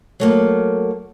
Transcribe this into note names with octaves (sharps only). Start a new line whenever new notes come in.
F#3 A3 A#3